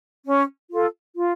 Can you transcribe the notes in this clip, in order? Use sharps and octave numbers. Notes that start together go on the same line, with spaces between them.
C#4
F4 A4
F4